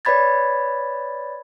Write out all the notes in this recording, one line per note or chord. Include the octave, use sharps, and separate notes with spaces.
B4 C#5 D5 B5 G#6 A6